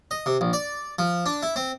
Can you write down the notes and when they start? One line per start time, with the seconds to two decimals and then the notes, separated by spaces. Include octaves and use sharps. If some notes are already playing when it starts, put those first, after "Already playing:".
0.11 D#5
0.26 C3
0.41 A#1
0.53 D5
0.99 F3
1.26 D4
1.43 E4
1.56 C4